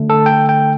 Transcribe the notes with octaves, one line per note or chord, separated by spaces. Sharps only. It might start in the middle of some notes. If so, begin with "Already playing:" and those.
Already playing: D3 A3
A4
G5
G5